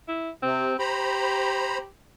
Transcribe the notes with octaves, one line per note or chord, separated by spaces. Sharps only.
E4
C3 C4
G4 C5 A#5 B5